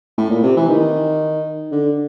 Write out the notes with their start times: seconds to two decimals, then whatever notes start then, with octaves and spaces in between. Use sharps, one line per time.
0.18 A2
0.30 A#2
0.43 C3
0.56 E3
0.69 D#3
1.72 D3